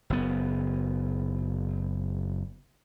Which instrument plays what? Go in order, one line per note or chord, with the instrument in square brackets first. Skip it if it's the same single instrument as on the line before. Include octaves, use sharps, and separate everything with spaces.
[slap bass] F#1 B3